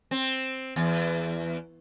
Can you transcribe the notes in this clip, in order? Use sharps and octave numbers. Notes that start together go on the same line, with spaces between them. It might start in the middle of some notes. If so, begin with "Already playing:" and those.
C4
E2